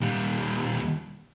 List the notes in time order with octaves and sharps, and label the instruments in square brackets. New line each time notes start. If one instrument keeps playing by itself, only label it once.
[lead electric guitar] D#2 G3